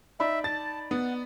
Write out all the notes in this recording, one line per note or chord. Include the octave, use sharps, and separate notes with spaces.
D#4 D5 E5 B5
A5 A6
B3 F#5